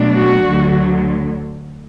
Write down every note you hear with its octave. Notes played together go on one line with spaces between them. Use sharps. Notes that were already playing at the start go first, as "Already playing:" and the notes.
Already playing: B2 F#3 A3 D4
F#4
D2 D3 F#3